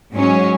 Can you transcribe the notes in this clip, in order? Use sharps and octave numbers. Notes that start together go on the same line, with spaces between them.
G#2 F#3 C#4